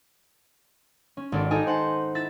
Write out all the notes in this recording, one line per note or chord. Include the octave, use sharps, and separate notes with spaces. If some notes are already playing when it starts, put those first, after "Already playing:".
C#4
G#1 A4 D5
D#4 G4 A4 D#5 G#5
C5 F#5 A5
E4 A6 B6 E7